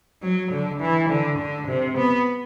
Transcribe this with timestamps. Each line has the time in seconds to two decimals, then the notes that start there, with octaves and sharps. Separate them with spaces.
0.22 F#3
0.51 D3
0.80 E3
1.09 D3
1.38 D3
1.68 C3
1.97 B3